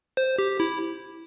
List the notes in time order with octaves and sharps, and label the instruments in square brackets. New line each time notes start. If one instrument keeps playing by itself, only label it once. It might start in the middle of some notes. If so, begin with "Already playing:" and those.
[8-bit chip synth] C5
G4
E4